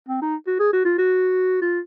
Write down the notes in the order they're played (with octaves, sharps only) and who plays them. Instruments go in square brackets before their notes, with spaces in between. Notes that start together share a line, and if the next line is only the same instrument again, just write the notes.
[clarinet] C4
D#4
F#4
G#4
F#4
F4
F#4
F4